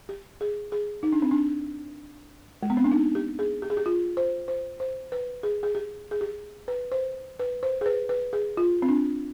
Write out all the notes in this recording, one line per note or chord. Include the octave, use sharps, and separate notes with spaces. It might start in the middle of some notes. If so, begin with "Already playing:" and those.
G4
G#4
G#4
D#4
D4
C4
D4
G#3
B3
C4
D4
D#4
G4
G#4
G4
G#4
G4
F4
C5
C5
C5
B4
G#4
G#4
G4
G#4
G4
B4
C5
B4
C5
G#4
B4
B4
G#4
F4
C4
D4